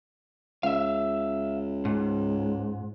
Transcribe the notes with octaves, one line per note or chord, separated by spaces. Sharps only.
C#2 E5 F5
G#2